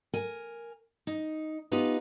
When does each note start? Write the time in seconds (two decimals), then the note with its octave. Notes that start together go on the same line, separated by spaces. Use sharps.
0.13 A#4 G#5
1.07 D#4
1.72 B3 D#4 F4 G4 B4